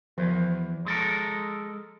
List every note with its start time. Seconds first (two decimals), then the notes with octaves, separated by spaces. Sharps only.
0.18 E2 F3
0.86 G#3 A4 A#4